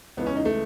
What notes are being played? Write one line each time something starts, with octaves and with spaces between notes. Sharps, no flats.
C#2 C#3 E3 B3
C#4
D#4
A3